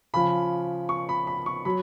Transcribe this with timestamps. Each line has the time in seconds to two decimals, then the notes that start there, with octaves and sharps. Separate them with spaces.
0.14 C#3 F3 B5
0.89 C#6
1.09 B5
1.27 B5
1.46 C#6
1.65 F#3 B5